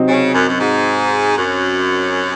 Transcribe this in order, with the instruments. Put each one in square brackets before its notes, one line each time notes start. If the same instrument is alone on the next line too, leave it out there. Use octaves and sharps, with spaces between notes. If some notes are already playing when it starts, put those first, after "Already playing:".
Already playing: [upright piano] C3 F#3 C4 D#4
[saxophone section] C#3
F#2
F#2
G#2
F#2